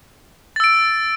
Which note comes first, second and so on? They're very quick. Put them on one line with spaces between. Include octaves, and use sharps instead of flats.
A6 E6 D7